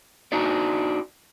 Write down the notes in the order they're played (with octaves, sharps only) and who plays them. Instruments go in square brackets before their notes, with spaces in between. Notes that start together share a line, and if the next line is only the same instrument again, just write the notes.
[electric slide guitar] D4 D#4 F#4 D5